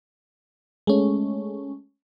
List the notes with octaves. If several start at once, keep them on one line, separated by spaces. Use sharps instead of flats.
G#3 A3 C#4